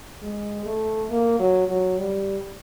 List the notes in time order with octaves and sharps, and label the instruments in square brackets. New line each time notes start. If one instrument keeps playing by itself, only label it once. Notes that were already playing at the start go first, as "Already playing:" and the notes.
[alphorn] G#3
A3
A#3
F#3
F#3
G3